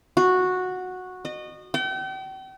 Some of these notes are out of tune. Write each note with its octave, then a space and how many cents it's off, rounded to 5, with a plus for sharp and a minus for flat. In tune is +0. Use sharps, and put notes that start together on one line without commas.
F#4 -10
D#5 -30
G5 -40